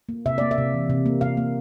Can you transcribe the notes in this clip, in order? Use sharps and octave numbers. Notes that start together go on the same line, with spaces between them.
A#3
C3 E5
A#3 D5
E5
C3
E3
C3
A#3
C3 F5
A#3